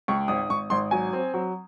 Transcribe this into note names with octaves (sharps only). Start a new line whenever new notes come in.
C#2 C#6
G#1 D#6
G#1 C#6
G#1 C6
F#3 G#5
C4
F#3